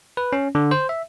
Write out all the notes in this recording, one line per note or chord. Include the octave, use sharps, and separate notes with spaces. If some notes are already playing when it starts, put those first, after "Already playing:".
B4
C#4
D3
C5
E5